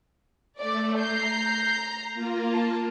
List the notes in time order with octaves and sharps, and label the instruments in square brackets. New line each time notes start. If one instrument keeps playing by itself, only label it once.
[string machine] A3 [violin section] D5
[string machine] A#5 [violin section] G6 C7
[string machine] A#3 F4
[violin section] A5